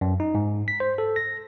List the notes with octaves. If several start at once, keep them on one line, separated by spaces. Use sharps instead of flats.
F#2
D#4
G#2
B6
C5
A4
A#6